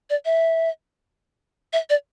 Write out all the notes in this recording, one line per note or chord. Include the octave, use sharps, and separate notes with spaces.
D5
E5
E5
D5